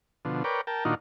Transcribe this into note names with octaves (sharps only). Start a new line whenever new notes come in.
B2 D3 F3
A#4 B4 C#5 D5 G5
A#4 G5 A5
A#2 D#3 D4 D#4 F4 F#4